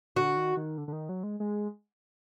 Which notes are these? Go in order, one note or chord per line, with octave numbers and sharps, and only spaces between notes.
D3 F#4
D#3
D#3
D3
D3
D#3
F#3
G#3
G#3